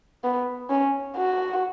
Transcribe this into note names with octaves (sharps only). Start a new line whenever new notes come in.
B3
C#4
F#4